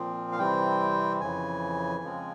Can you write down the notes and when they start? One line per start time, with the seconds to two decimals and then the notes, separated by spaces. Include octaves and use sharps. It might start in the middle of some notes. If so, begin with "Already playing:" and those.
Already playing: A#2 F3 C4
0.32 F5
0.39 C3 E3 G3 C4 G5
1.21 F2 C#3 E3 G#5
2.03 C#3 F3 G#3 C4